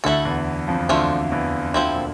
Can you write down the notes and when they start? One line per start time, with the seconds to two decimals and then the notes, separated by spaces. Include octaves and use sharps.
0.04 D2 D3 A3 E4 A4
0.25 E2 E3
0.68 F2 F3
0.89 D2 D3 F3 A3 D4 F4
1.32 E2 E3
1.74 D2 D3 F3 C4 E4
1.93 A#2